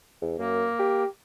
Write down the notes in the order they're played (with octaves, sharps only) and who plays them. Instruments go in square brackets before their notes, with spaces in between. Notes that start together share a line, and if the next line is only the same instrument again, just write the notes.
[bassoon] E2
[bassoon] F#2 [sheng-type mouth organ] A#3
[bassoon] G4